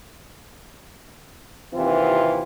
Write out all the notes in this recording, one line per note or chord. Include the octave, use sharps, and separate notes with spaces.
D#2 C3 E3 C4 F4